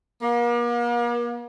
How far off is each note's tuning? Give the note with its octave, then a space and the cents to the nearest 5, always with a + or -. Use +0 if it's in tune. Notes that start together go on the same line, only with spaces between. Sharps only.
A#3 +40